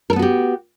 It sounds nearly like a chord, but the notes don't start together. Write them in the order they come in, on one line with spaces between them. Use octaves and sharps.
A#4 A4 B3 F#4 G4